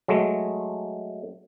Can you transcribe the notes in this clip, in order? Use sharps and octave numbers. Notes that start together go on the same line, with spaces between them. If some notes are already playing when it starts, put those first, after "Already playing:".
F#3 G#3 A3